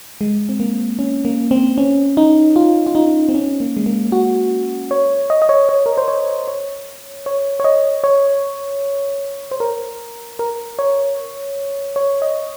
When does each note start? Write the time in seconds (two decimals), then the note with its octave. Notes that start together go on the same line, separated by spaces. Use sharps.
0.21 G#3
0.49 C4
0.60 A#3
0.99 C#4
1.25 A#3
1.51 C4
1.78 C#4
2.17 D#4
2.56 F4
2.87 F4
2.95 D#4
3.29 C4
3.35 C#4
3.60 A#3
3.77 G#3
3.86 A#3
4.12 F#4
4.91 C#5
5.30 D#5
5.42 D#5
5.49 C#5
5.69 C#5
5.86 A#4
5.97 C5
6.08 C#5
6.48 C#5
7.26 C#5
7.60 C#5
7.64 D#5
8.04 C#5
9.51 C5
9.60 A#4
10.39 A#4
10.79 C#5
11.96 C#5
12.22 D#5